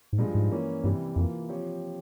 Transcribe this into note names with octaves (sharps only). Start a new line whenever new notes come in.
G#2
G2 A#2 F3 G#3
G#2
E3 A#3 C#4
G2 C3 E3 G3
F2 E3 A#3 F4
F3 C4 G4 C#5